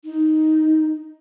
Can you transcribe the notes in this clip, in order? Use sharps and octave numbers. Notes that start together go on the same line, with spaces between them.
D#4